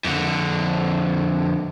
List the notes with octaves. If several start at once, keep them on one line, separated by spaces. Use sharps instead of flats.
F2 D3